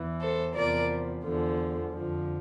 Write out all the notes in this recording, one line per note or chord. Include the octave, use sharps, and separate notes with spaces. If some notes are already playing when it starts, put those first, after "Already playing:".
Already playing: E2 E3
A4 C5
E2 C3 F3 A#4 D5
E2 D3 F3
F2 D3 F3